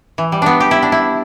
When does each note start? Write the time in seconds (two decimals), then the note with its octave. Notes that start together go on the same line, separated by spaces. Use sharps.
0.18 E3
0.32 G3
0.42 B3 D4
0.60 G4
0.71 E4
0.82 D4
0.92 E4